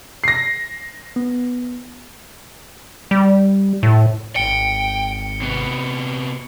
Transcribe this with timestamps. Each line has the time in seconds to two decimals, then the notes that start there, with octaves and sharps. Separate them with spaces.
0.24 A#6 C7
1.16 B3
3.11 G3
3.83 A2
4.36 G#1 G5 C#7 D7 G7
5.41 C3 B3